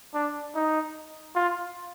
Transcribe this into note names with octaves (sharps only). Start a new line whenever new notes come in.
D4
D#4
F4